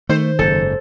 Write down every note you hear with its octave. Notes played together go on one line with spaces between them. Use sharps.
D#3 A3 C5
F#1 G#2 A4